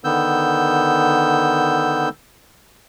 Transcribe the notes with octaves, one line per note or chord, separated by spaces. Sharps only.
D3 D#3 B3 E6 G6